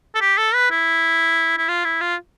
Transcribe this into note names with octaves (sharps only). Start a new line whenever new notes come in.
A4
G4
A4
B4
E4
E4
F4
E4
F4